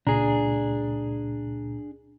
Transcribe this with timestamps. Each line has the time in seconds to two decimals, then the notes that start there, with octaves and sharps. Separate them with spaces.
0.07 C#2 A#2 D4 G#4 A#5